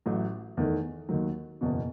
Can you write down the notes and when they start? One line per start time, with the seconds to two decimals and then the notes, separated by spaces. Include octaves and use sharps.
0.06 A1 A2 F#3
0.57 E2 D#3 A3
1.09 D#2 D#3 F#3
1.61 F#1 E2 B2